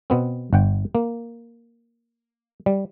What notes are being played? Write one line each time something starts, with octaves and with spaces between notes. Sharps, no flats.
B2 B3 C4
G1 F#5 G5
A#3
G3